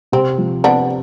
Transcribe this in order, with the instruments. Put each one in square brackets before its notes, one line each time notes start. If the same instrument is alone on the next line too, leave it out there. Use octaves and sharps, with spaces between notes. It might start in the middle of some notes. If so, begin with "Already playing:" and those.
[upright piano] C3 [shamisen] C4
[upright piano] F3
[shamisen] B3 D4 [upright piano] C4